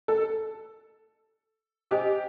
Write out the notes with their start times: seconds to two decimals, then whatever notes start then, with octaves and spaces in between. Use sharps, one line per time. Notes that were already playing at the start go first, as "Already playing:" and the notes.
0.08 A4
1.91 G4 A4 C5 D#5 G#5